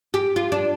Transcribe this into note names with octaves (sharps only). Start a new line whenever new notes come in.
G4
F4
D4